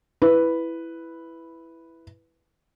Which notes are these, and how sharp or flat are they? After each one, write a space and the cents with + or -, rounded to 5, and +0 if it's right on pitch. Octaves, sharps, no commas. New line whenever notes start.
E4 +5 B4 +0